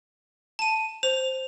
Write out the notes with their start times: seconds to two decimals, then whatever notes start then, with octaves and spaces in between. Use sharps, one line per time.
0.59 A5 D#7
1.03 C5 F7